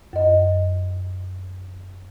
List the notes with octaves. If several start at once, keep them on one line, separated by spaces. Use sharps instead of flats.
F#2 D#5